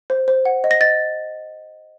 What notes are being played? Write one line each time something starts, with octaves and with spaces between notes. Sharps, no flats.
C5
C5
F#5
D#5
A#6
D#5 A6